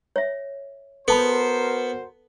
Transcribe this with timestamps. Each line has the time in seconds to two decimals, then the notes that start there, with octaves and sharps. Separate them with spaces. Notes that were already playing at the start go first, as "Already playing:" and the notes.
0.16 C#5 E5
1.08 B3 F#4 A4 A#4 C5 A5 B5